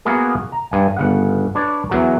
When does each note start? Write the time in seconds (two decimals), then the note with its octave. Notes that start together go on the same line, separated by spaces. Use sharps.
0.05 A#3 B3 F#4 G#4 A#4
0.52 A#5
0.71 G2 G#5
0.97 G1 C#3 F#5
1.55 D4 B4 C#5 D5
1.90 E2 F#3 A#4